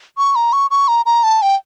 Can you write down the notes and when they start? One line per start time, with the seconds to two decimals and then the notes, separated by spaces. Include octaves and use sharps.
0.18 C#6
0.35 A#5
0.53 C#6
0.71 C#6
0.88 A#5
1.06 A#5
1.24 A5
1.42 G5